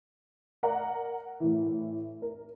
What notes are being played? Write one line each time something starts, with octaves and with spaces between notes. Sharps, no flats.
A#4 D5 F#5 A#5
A2 E3
A#4